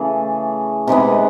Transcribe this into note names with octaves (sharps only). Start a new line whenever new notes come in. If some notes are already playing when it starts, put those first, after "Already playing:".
Already playing: C#3 E3 A3 G#4
C3 D#3 G#3 B3 G4